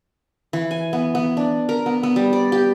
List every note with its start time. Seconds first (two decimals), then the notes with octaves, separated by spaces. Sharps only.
0.53 E3
0.71 G#5
0.93 B3
1.15 B3
1.37 D4
1.69 A#4
1.86 B3
2.03 B3
2.16 G3
2.33 D5
2.52 G4